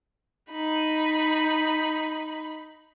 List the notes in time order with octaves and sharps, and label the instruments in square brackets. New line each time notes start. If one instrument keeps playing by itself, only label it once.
[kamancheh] D#4 B5